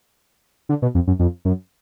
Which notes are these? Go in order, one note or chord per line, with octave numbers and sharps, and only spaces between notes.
D3
B2
F2
F#2
F2
F#2